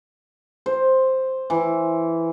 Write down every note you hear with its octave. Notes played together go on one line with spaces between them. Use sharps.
C5
E3